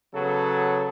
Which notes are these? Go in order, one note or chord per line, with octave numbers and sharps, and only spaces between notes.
C#3 F#3 B3 A4